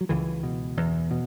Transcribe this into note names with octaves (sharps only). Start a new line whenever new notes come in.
F#3
C#2 E3
B2
E2
B2